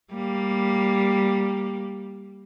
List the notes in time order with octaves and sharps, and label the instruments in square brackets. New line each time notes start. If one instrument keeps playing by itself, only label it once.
[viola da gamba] G3 A#3